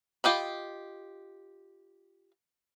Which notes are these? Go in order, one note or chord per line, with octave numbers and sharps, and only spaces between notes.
F4 G4 D#5 B5